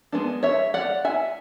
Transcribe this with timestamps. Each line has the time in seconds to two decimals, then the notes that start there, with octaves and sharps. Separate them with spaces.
0.12 G#3 B3 D4
0.43 C#5 E5
0.74 D5 F#5
1.05 E5 G#5